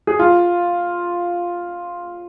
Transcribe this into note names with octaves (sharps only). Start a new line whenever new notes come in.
G#4
F4